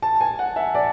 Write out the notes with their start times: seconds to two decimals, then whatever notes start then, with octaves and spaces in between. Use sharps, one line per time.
0.02 A5
0.21 G#5
0.39 F#5
0.56 E5
0.75 D5